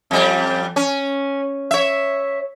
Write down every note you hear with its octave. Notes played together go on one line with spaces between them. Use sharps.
F2 G3
C#4
C#5 E5